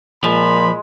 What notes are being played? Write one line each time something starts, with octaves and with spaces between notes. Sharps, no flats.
A#2 F3 G#3 B5